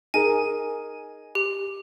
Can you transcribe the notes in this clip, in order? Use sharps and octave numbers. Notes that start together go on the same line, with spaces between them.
D#4 G#4 A#4 G#5
G4